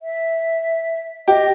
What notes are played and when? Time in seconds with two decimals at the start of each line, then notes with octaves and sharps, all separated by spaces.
0.03 E5
1.28 G4 D#5